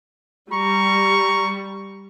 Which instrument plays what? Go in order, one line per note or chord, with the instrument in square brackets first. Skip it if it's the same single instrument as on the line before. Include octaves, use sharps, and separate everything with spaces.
[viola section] G3 [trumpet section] A#5 C#6